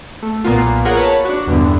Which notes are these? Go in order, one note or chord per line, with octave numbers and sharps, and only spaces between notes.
A3
B1 A#2 A#3 B3 F4
F4 G#4 A#4 C#5 F#5
B4 C#5 A5
D4 F#4
E2 G2 B2 D3 B3